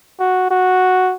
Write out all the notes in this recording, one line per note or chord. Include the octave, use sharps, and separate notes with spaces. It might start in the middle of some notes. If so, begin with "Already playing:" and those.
F#4
F#4